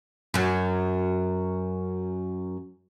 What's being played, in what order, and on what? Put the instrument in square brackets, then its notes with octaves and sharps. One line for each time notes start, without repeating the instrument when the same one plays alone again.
[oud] F#2 F#3